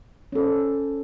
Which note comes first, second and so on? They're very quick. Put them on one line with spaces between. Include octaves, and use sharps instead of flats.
C#4 A4 C5